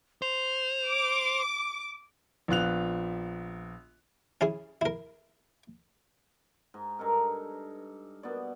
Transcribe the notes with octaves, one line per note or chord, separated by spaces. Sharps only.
C5 F7
D6
A#1 B3 F4 F#6 F7
C#4 E4 G#4
E4 A#4
G#2
G2 D#4 A4 A#4
B2 B3 D5